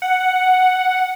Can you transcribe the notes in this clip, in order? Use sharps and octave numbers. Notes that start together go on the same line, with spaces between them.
F#5